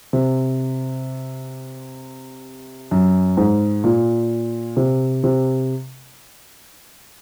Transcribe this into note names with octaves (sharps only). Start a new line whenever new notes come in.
C3
F#2
G#2
A#2
C3
C3